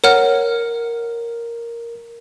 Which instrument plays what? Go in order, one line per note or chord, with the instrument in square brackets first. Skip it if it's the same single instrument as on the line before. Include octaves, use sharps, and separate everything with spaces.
[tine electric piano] A#4 [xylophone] C#5 F#5 F6